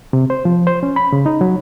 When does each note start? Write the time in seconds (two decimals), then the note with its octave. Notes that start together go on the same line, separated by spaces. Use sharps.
0.13 C3
0.30 C5
0.45 F3
0.67 C5
0.83 C#4
0.96 B5
1.13 C#3
1.26 D#4
1.41 F#3